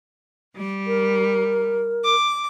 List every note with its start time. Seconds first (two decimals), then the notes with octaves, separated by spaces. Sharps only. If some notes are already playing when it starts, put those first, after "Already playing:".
0.55 G3
0.87 A#4
2.05 D6